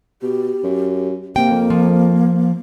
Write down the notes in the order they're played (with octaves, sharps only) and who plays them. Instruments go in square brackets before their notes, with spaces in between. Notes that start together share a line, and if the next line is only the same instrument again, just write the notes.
[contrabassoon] B2 [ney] G4
[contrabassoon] F#2
[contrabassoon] C3 [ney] A#3 [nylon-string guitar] G5
[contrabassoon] F2
[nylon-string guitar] F3